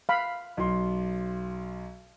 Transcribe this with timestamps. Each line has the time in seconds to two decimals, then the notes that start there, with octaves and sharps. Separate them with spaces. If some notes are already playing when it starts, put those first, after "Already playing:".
0.09 F5 B5
0.57 B1 C6